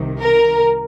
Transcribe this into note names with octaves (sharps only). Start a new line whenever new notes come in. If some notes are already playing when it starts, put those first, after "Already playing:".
Already playing: C2 C3 D#3
A#4